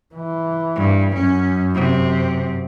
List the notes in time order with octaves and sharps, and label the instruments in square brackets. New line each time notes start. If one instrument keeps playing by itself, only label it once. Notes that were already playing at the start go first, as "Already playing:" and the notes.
[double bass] E3
[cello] G2
[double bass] F#2 [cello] C#4
[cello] C3